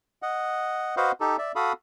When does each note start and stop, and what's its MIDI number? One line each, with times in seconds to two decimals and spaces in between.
0.22 0.95 75
0.22 0.95 78
0.97 1.12 66
0.97 1.12 71
0.97 1.12 72
0.97 1.12 75
0.97 1.12 77
0.97 1.12 78
1.21 1.37 63
1.21 1.37 67
1.21 1.37 69
1.38 1.52 74
1.38 1.52 76
1.56 1.73 66
1.56 1.73 69
1.56 1.73 77
1.56 1.73 83
1.56 1.73 87